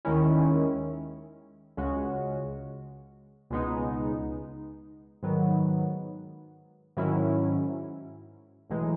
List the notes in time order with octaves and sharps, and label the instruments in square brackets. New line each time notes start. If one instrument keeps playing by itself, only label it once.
[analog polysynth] D#2 D#3 G#3 C#4 E4
C#2 C#3 G#3 C#4 F#4
C#2 B2 G#3 B3 D#4
G#2 D#3 F#3 B3
G#2 D#3 F#3 C#4 E4
B1 A2 E3 G#3 D#4